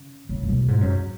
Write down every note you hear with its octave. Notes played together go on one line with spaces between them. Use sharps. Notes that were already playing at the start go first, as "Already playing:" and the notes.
Already playing: C#3
C#3
A2
B2
G#2
F#2